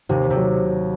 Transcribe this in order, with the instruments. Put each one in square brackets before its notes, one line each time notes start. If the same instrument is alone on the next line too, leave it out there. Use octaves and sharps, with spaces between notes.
[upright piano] D#2 [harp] C3
[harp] C3
[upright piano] F#3